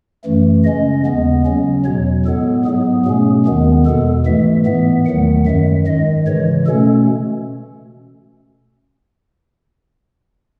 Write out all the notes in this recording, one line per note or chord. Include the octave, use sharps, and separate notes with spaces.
F#2 E3 A3
C#3 G#3 C#4 D#5
D#2 C#3 G#3 B3
C#3 F#3 C#4
E2 B2 F#3 C#5
A2 G#3 B3 A4
G#2 F#3 B3 G#4
B2 A3 C#4 G#4
D#2 D#3 G#3 B3
E2 B2 G#3 A4
G#2 E3 A3 E5
A2 E3 B3 E5
D#2 D#3 F#3 A3 F#5
F#2 D#3 G#3 E5
G#2 D#3 G#3 D#5
C#3 E3 G#3 C#5
B2 A3 C#4 A4